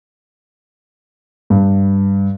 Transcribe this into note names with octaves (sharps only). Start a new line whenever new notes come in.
G2